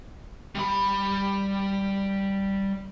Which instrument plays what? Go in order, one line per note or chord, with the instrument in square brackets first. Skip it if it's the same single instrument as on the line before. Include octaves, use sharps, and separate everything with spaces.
[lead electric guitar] G3 B5